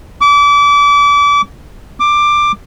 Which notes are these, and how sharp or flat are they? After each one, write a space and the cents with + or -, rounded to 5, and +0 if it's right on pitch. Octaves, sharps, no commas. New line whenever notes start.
D6 -30
D6 +10